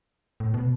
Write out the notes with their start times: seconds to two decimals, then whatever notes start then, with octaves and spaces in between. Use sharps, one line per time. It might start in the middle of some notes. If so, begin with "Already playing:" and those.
0.40 A2
0.54 B2